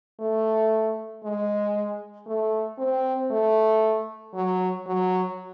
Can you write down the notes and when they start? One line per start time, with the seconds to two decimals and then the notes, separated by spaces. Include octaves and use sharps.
0.20 A3
1.24 G#3
2.27 A3
2.78 C4
3.31 A3
4.34 F#3
4.86 F#3